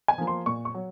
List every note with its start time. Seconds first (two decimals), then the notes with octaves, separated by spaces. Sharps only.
0.08 G#5
0.18 F3 A#3
0.27 C6
0.46 A#2 C#6
0.65 C#6
0.74 F#3